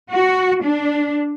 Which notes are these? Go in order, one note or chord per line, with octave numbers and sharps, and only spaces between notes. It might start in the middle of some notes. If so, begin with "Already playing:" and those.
F#4
D4